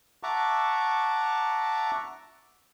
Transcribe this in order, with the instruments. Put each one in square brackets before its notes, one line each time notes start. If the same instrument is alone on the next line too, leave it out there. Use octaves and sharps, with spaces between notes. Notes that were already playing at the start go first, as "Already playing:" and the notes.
[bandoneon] E5 F#5 A5 A#5 C#6 D6